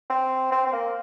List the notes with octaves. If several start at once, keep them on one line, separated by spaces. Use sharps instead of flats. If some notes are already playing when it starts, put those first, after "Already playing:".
C4
C4
C4
A#3